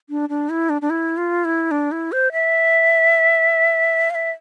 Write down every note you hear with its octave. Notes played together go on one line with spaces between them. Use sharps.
D4
D4
E4
D4
D4
E4
F4
E4
D4
E4
C5
E5
F5
E5